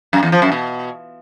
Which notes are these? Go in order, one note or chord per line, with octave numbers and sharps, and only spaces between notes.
F#2
E2
F3
F#2
B2